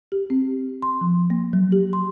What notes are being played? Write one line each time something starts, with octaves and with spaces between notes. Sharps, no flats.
G4
C4
C6
F3
A#3
F#3
G4
C6